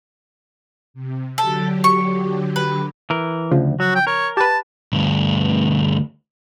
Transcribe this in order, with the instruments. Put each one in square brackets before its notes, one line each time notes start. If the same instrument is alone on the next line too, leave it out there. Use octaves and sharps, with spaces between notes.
[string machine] C3
[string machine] D3 F#3 G4 [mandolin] A4
[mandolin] C#6
B4
[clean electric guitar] E3 A#4
[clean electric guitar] D2 [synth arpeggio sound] C#3 F3
[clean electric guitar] F#3 [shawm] F#4
[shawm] G5
[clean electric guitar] A#4 [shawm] C#5
[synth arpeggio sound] G4 B4 [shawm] A5
[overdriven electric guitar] D2 G2